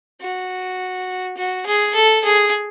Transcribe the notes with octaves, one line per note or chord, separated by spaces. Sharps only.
F#4
F#4
G#4
A4
G#4